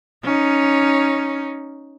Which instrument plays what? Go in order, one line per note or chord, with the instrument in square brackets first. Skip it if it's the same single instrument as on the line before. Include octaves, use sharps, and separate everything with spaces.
[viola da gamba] C#4 D#4